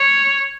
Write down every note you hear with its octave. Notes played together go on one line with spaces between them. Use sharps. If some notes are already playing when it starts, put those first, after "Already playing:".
Already playing: C#5